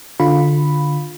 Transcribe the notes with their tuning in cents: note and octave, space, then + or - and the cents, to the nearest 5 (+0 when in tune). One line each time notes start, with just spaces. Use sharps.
D3 +0 F4 +15 B5 +0